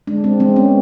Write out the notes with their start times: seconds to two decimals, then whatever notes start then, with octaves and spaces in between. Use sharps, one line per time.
0.07 G#3 D4
0.24 G#3 C4
0.40 G#3 C4
0.56 B3 C#4